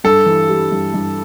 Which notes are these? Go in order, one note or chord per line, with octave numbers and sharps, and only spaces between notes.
G2 A4
E3
G3
G2
G2